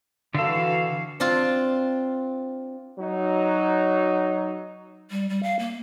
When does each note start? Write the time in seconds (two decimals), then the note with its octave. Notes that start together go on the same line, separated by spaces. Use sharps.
0.34 D3 E3 F#4 A4 F5
1.20 C4 D4 F4
2.99 F#3 D#4
5.10 G3
5.29 G3
5.43 F5
5.59 A#3